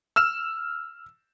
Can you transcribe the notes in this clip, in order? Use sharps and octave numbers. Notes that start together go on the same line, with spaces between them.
E6 F6 E7